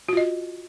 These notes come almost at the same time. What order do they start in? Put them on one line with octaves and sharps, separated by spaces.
F#4 F4 D#5